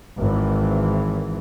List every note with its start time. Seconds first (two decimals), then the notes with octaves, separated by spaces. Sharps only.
0.18 G#1 E3